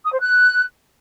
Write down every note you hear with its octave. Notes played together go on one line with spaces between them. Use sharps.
D#6
C5
F#6